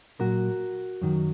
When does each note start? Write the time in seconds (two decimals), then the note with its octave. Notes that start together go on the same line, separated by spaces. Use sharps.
0.20 A#2 F#3 F#4 A#4
1.02 F#2 D#3 F#3